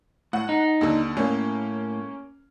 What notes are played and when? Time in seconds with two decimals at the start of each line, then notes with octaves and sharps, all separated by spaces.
0.33 A2 F#5
0.49 D#4
0.81 D#2 D3
1.17 A2 A#3 C#4